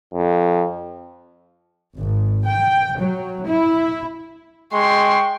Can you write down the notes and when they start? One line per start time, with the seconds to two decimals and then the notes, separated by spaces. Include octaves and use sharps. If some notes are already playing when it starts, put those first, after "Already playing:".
0.14 F2
1.97 G#1
2.46 G5
2.98 F#3
3.46 E4
4.73 G#3 G5 C6 C#6